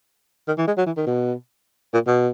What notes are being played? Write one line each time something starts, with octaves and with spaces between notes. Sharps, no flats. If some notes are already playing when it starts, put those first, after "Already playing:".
D#3
E3
G#3
F#3
E3
D#3
B2
A#2
B2